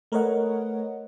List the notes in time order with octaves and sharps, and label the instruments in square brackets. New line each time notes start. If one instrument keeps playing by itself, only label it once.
[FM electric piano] A3 A#4 B4 C#5 D#5 F#5